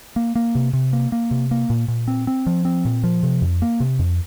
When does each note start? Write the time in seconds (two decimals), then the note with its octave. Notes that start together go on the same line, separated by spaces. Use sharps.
0.16 A#3
0.35 A#3
0.55 C3
0.73 C3
0.93 A#3
1.12 A#3
1.31 C3
1.51 A#3
1.70 A#2
1.88 A#2
2.08 C4
2.27 C4
2.47 F3
2.65 C4
2.85 A#2
3.04 F3
3.23 C3
3.42 F2
3.62 A#3
3.80 C3
3.99 F2